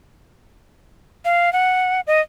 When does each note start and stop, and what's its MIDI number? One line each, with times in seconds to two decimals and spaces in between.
1.25 1.52 77
1.53 2.01 78
2.07 2.21 75